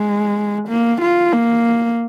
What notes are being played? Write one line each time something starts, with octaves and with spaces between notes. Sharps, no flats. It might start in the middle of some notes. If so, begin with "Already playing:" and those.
Already playing: G#3
A#3
F4
A#3